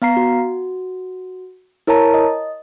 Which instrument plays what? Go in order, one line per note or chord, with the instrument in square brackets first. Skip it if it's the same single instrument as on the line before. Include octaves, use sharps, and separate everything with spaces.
[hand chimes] B3 F5 A#5 C7
F#4
E4 A#4 C#5 A5 A#5
D#5